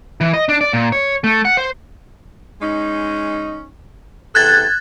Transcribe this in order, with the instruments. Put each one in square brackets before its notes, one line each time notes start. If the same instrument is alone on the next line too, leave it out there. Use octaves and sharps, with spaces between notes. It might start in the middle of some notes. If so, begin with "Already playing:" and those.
[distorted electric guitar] E3
D#5
D4
D5
A#2
C#5
A3
F#5
C5
[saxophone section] G#3 C#4 D#4
[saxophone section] E2 C3 A4 [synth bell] F#6 G#6 A6